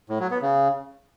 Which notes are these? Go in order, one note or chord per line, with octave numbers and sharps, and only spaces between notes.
A2
F#3
B3
C#3